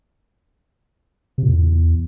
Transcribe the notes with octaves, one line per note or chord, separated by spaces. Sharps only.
C3
A#2
E2